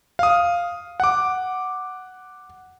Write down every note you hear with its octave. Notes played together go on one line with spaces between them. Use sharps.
F5 D#6
F#5 D6